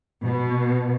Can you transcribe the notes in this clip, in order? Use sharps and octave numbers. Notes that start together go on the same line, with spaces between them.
B2